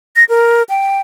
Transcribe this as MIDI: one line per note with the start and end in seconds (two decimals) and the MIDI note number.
0.16 0.24 94
0.29 0.63 70
0.69 1.01 79